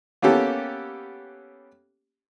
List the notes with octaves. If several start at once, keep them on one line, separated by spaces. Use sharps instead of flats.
A#3 B3 C#4 G4 A4